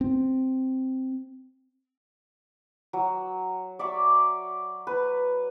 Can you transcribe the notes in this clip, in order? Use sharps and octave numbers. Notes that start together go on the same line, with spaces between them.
C4
F#3
D5 E5 C#6 D6
B4